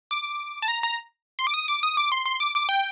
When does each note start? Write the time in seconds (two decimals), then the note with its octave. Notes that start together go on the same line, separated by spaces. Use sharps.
0.11 D6
0.62 A5
0.68 A#5
0.83 A#5
1.39 C6
1.47 D6
1.54 D#6
1.68 D6
1.83 D#6
1.97 D6
2.12 C6
2.26 C6
2.40 D6
2.55 D6
2.69 G5